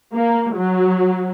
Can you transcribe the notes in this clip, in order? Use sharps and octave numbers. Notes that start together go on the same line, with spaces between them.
A#3
F#3